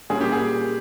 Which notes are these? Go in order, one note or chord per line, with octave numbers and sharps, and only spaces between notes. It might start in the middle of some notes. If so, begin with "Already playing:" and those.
A#2 G3 C#4 G#4
G4
G#4